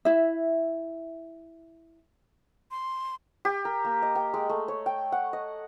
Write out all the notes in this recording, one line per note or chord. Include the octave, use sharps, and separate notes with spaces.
E4 E5
C6
G4
A#4
A#3
D#5
G5
G#3
A3
C#5
G5
F#5
D#5